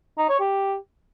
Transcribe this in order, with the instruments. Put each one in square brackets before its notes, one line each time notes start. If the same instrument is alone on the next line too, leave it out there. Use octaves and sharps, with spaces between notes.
[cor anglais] D#4
C#5
G4